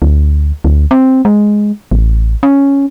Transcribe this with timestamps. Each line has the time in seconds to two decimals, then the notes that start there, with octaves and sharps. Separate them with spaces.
0.02 D2
0.64 D2
0.91 C4
1.25 G#3
1.91 A1
2.43 C#4